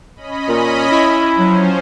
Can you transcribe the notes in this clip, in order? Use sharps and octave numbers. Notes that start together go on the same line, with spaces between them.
C#4 D#5 B5
A#2
E4
F3 F#3 C#4 C5